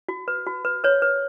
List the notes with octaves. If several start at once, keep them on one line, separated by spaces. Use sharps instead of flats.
F#4
B4
F#4
B4
B4 C#5
B4